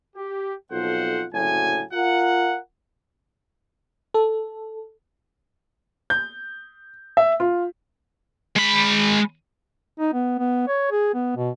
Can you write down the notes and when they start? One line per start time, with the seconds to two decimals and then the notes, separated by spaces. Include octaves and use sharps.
0.16 G4
0.71 B1 F2 F4 A4 C5 F#5
1.33 F#1 D2 A2 F#3 G#5
1.93 F4 A#4 F5 F#5
4.14 A4
6.10 G6
7.17 E5
7.40 F4
8.56 G#3 B5
10.00 D#4
10.13 B3
10.39 B3
10.68 C#5
10.91 G#4
11.14 B3
11.36 B2